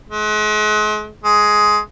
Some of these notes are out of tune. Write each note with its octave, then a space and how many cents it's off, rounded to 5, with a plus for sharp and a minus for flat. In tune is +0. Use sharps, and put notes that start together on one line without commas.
G#3 +40
G#3 +10